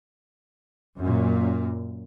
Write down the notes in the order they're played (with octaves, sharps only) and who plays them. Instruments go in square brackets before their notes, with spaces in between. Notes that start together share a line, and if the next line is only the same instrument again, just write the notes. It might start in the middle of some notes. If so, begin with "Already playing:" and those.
[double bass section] F#2 A#2